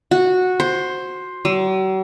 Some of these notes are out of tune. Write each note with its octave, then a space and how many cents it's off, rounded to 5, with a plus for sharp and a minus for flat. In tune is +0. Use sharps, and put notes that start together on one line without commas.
F#4 -10
C5 +10
F#3 +45